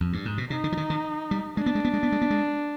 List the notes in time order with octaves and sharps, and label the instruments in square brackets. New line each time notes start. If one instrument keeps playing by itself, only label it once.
[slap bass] F2
G2
G#2
B2
[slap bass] C3 [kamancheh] D#4
[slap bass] D3
F3
D#3
D#3
G3
[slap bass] G#3 [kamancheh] D4
[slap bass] B3
G#3
B3
G#3
B3
G#3
B3
G#3